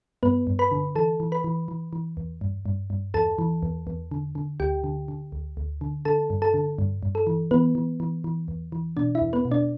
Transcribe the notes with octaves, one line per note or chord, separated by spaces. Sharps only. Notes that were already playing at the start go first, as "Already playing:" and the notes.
G2 B3 B4
G2
B4 B5
D3
E3 A4 A5
E3
B4 B5
E3
E3
E3
E2
G2
G2
G2
E2 A4 A5
E3
E2
E2
D3
D3
D2 G4 G5
D3
D3
D2
D2
D3
D3 A4 A5
G2
A4 A5
D3
G2
G2
A4
E3
E3 B3 B4
E3
E3
E3
E2
E3
B2 D4 D5
E4 E5
E2
B3 B4
B2
D4 D5